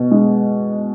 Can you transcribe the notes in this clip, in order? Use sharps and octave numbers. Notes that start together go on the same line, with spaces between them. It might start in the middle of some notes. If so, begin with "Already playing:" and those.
Already playing: B2
G#3